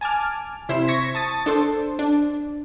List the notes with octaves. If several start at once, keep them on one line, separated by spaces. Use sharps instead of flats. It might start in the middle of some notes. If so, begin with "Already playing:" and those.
G#5 A5 D6 F6
C3 E4 C5 E7
C#6 G#6 A#6 B6
A5 D#6 A6
D4 A4 C5
D4